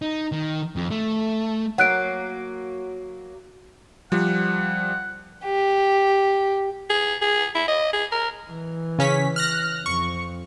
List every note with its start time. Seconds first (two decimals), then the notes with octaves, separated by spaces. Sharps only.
0.02 D#4
0.32 D#3
0.76 F2
0.91 A3
1.78 F#3 A#3 F#5 F#6 D7
4.12 F3 G3 F#5
5.44 G4
6.90 G#4
7.21 G#4
7.55 E4
7.68 D#5
7.93 G#4
8.12 A#4
8.52 E3
8.99 C#3 C#4 B6
9.36 F6 F#6 A#6
9.86 F2 C#6